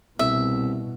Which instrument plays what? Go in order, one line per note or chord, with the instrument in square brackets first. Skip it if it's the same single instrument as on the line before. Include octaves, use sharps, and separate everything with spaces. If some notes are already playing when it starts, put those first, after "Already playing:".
[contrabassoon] C2 [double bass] B2 [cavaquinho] E5